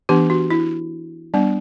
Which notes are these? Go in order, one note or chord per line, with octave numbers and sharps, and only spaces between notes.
E3 B3 D4 G4
F#4
E4
G3 B3 D4